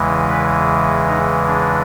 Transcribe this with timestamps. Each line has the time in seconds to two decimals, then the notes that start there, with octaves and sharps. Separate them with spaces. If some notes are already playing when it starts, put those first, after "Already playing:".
Already playing: E2 C#3 E3 G#3
0.28 B4
1.07 D#4
1.47 D4